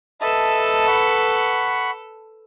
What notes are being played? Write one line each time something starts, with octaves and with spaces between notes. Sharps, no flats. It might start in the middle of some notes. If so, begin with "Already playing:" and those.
A4 B4 D#5 E5 A5
F#5 B5 C#6